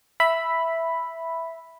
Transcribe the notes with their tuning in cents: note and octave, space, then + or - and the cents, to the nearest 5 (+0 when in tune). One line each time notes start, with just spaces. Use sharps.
E5 +0 B5 +0